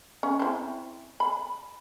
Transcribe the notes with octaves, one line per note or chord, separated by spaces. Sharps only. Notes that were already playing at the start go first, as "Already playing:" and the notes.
C#4
C4 E4
B5